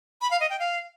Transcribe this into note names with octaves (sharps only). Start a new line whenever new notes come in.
B5
F5
D#5
G5
F5